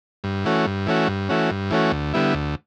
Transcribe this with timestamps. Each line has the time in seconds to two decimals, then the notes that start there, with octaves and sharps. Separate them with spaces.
0.24 G2
0.45 E3 A3 C#4 F#4
0.67 G2
0.87 E3 A3 C#4 F#4
1.08 G2
1.29 E3 A3 C#4 F#4
1.51 G2
1.71 E3 A3 C#4 F#4
1.92 D2
2.14 D3 G3 B3 E4
2.34 D2